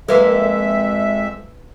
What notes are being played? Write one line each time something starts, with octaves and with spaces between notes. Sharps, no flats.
F2 G#3 A#3 A4 B4 E5